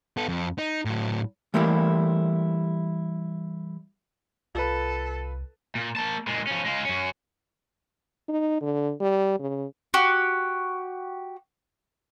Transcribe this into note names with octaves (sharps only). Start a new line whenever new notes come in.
B3 A4
F2
D#4
A2 F#3
E3 G3 A3 A#3 E4 G4
C2 F4 A4 B4
A#2
A#3 A5
A#2 G#3
F3 C#4
G#3 F4
F#2 C#4
D#4
D3
G3
C#3
F#4 G4